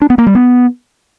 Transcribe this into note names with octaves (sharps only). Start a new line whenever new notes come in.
D4
B3
A#3
G3
B3